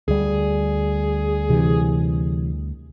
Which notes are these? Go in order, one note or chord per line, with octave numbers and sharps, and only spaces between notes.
D2 G3 G#4
C3 E3